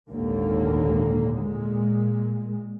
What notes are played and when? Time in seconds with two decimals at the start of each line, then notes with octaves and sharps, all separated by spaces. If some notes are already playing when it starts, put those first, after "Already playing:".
0.11 G#1 D#2 A#2 D3 A#3
1.39 A#2 G#3